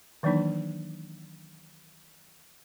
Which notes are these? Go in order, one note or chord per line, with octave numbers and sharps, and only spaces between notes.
D#3 E3 F#3 A#3 D4 D#4